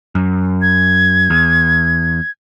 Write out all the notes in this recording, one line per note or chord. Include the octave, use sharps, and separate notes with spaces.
F#2
G#6
E2